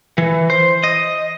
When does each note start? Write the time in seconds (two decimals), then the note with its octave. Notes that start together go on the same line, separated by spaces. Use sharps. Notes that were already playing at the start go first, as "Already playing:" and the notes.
0.18 E3
0.50 C5
0.84 D#5